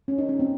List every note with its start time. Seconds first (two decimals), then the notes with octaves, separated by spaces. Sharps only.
0.08 C#4
0.18 D#4
0.29 C#4
0.39 C4